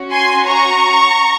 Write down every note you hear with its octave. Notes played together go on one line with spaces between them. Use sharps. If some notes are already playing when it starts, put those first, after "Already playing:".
Already playing: C#4 F#4
G#5 C6
A#5 C#6